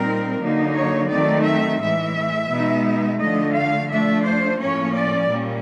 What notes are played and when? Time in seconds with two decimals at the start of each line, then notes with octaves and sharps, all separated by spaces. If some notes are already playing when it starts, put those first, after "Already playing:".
Already playing: A#2 G3 C4 D#4 A#4
0.40 D3 F#3 A#3 D#4
0.75 C#5
1.10 D#3 F#3 A3 C4 D#4 D5
1.45 E5
1.80 A2 E3 G#3 E5
2.50 B2 G#3 B3 D#4
3.20 D3 F3 A3 D#5
3.55 F5
3.90 F3 A3 D4 E5
4.25 C5
4.60 A2 F3 A#3 C#4 C#5
4.95 D5
5.30 A#2 G3 A#3 C#4